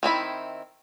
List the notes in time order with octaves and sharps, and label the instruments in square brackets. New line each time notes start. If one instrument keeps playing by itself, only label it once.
[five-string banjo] D#3 C4 E4 B5